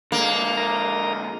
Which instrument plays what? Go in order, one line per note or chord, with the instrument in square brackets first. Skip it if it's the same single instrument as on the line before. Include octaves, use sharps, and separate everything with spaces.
[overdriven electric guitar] D3 G#3 [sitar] A#3
[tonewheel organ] A#4 D#5 A#5